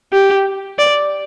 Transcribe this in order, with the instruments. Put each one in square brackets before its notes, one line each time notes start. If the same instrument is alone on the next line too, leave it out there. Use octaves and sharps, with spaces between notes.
[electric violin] G4
D5